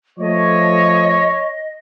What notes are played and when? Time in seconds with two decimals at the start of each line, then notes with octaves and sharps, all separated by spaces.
0.19 F3 A3 C#5 D#5